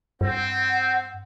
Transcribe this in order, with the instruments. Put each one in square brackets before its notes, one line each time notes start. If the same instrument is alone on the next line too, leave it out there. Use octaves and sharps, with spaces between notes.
[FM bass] G2 [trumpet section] C4 [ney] F#5